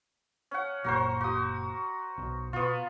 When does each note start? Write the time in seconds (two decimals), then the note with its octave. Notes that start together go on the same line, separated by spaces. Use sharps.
0.51 C#4 F#5
0.84 F#1 A#2 F#4 A#4 C5
1.21 F#4 D#6
2.18 B1 B2
2.53 B2 B3 F4